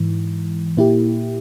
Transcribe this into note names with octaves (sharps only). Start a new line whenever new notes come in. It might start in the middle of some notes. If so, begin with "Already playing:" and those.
Already playing: G#2 E3
A#2 A#3 E4 G4